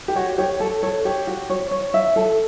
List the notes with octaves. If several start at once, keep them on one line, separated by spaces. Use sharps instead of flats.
G4
F#4 C#5
G4 C#5
A4 A5
A4 C#5
G4 C#5
F#4
C#5
C#5
E5
A4